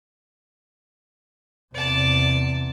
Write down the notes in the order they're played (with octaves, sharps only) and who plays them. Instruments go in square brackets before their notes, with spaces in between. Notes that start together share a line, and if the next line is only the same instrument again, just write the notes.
[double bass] E2 C3 [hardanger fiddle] D5 A5